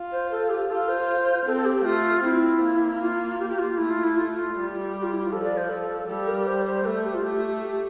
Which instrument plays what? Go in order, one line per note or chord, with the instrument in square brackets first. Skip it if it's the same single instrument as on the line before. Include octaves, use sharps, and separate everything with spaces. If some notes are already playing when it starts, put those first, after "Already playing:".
Already playing: [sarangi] F4
[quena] C5
A4
G4
[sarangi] F4 [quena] A4
[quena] C5
[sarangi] C4 [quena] A4
[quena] A4
G4
[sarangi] A3 [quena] F4
[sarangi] C4 [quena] E4
[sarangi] A#3
[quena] F4
G4
G4
F4
[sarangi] A3 [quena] E4
[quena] F4
E4
F4
F4
[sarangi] G3
[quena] G4
F4
E4
F4
[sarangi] F3 [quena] A4
[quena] D5
C5
A4
[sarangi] G3 [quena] A4
[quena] A#4
C5
C5
[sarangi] A3 [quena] A4
[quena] G4
F4
[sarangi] A3 [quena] G4
[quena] G4